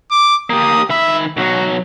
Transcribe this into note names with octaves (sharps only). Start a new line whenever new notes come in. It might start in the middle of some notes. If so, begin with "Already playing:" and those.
D6
A#3 G4 D#6
D#3 E5 B5
B1 F#3 F#4